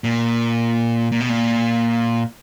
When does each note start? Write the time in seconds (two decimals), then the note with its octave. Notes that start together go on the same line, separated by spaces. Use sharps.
0.04 A#2
1.12 A#2
1.20 B2
1.29 A#2